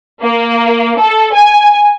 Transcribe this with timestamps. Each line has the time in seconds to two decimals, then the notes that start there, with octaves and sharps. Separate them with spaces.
0.21 A#3
0.98 A4
1.33 G#5